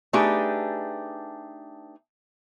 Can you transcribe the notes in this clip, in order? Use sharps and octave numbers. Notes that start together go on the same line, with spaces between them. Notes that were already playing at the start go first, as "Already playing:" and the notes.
A3 D4 D#4 G4 G#4 B4